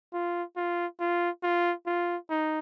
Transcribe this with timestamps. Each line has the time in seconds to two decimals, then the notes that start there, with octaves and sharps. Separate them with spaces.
0.13 F4
0.56 F4
1.00 F4
1.43 F4
1.86 F4
2.30 D#4